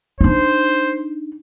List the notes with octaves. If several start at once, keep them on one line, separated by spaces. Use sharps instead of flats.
D4 D#4 C5